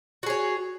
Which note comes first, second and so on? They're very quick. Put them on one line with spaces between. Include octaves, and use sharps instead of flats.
F#4 G#4 C#5